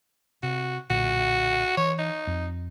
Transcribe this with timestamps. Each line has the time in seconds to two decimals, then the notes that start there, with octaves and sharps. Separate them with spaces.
0.43 C3 F#4
0.90 B1 A#2 D3 F#4
1.77 E3 C#5
1.99 D#4
2.27 F2